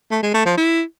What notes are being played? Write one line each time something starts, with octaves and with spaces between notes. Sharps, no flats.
A3
G#3
A3
F3
E4